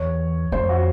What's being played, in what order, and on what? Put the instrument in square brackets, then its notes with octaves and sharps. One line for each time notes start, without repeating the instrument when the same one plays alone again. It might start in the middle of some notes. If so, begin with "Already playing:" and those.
Already playing: [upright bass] E2 [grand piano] C#5
[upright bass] F2 [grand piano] C5
[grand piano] F#4